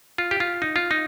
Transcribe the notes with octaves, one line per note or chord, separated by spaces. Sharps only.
F4
G4
F4
D#4
F4
D#4